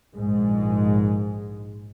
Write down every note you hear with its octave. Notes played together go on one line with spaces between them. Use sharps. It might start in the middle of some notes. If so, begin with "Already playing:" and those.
A#1 G#2 G#3